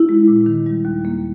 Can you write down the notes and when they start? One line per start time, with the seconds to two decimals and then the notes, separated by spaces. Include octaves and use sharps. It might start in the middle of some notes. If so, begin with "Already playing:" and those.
Already playing: E4
0.09 G#3
0.27 A#2
0.46 D#3
0.66 G3
0.85 D#2
1.05 A#3